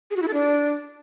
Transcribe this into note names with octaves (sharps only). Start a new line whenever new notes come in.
G#4
F#4
E4
A4
D4